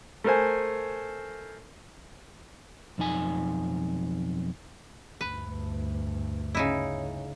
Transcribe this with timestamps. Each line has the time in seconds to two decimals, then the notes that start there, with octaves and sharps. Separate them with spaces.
0.24 A3 A#4 C5 G#5
2.98 B1 F2 D#4 G#5
5.21 D2 G2 B4
6.55 C#3 D#4 E4